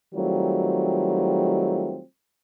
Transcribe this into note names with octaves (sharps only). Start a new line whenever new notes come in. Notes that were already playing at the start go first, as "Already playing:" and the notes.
D#3 F#3 G3 A3 C4 F4